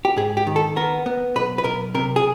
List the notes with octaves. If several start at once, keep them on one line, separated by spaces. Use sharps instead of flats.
G4
G#2 G#4
G4
D#3
A4
B3 A#4
B3
B1 B4
B4
B1 A#4
C3 A#4
G#4